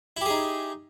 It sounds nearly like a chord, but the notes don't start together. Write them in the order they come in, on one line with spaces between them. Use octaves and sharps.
E4 G4 G#4 D#4